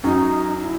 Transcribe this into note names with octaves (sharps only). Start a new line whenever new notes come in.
F#2 F#3 D#4
E4